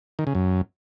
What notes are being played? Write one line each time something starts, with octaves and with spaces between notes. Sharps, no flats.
D#3
C#3
F#2